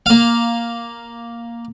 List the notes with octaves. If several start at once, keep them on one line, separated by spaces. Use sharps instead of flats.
A#3 F5